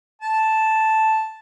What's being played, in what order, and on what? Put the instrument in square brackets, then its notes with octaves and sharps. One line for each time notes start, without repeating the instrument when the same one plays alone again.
[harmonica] A5